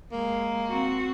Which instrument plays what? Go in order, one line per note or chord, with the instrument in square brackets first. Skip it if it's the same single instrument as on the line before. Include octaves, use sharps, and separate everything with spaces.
[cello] G#3 [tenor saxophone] A#3
[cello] C4 F#4